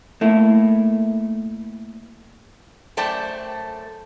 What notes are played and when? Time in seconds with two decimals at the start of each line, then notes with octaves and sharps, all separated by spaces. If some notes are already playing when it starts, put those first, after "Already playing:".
0.21 A3 A#3 E4 A4
2.97 F#2 A3 C5 D5 G5 A5